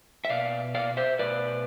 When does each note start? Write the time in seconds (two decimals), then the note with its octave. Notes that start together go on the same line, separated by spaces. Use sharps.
0.25 E5
0.29 B2 D5 F5
0.75 D5 F5
0.97 C5 E5
1.19 B2 B4 D5